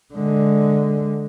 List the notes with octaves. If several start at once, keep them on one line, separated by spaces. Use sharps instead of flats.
D3 G#3